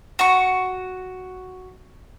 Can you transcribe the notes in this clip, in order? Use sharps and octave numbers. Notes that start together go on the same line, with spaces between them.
F#4 C#6